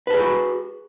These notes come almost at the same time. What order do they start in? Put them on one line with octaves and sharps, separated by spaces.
B4 A5 G#4 B5 F#4